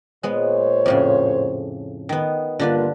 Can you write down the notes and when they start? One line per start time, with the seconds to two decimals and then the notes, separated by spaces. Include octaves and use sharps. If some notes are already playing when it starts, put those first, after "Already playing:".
0.23 A#2 G#3 B3 C5 C#5
0.86 F2 A2 C#3
2.09 D#3 B3
2.59 G2 D3 A#3 D4 F4 B4